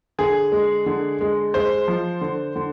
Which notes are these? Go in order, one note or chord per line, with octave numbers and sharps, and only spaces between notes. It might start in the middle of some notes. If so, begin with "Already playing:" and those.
D3 G#4
G#3
D3
G#3
G#3 C5
F3
D3
D3